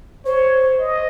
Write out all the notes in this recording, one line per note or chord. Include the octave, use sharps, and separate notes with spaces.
C5 C#5
D#5